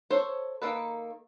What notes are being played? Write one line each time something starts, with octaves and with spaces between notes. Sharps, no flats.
A4 C5 C#5
D#3 A#3 A4 B4